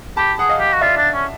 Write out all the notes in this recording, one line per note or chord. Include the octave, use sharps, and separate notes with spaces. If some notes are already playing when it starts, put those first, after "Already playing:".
G4 A5 B5
G#4 F#5
D#5 F5
G4
F#4
F4 D5 E5
D4
C#4